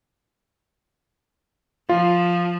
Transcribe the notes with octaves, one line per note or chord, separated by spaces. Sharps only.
F3 F4